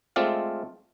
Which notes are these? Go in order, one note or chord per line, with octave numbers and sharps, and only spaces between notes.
G#3 A3 C4 F4 D5 F5